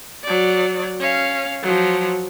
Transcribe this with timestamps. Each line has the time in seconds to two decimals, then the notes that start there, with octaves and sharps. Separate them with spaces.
0.24 F#3 D5
0.99 C#4 F5
1.62 F3 F#3